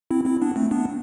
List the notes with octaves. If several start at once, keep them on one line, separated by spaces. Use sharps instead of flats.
C4 E4
C4 E4
B3 D4
A3 C4
B3 D4